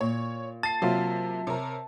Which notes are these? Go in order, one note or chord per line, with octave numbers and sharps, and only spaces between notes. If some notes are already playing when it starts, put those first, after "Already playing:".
A#2 C#5
A5 A6 C7
C3 F#3 A#3 F4
C3 A#4 C#5